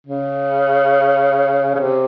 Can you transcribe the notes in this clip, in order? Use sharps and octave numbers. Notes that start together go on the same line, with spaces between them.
C#3
C#3
C3